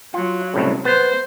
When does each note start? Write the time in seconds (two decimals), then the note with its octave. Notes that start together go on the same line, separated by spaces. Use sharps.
0.14 F#3 F4
0.54 C2 A2 C#3
0.85 B3 C5